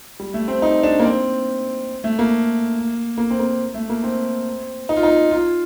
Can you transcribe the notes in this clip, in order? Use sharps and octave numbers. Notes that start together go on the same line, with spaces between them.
G3
A3
C4
D#4
D4
A#3
C4
A3
A#3
A#3
C4
A#3
A3
A#3
C4
D#4
F4
D#4
F4